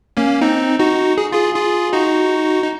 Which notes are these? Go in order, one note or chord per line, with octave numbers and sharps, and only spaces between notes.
A#3 C#4
C4 D#4
D#4 F#4
G#4
F4 G#4
F4 G#4
D#4 F#4
D#4